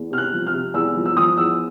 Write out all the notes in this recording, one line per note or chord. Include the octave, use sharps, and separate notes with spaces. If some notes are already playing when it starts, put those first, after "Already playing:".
Already playing: E2
C3 F6
F#6
F3
F6
C3
E2 E6
F3
E6
F3 D#6
E2 E6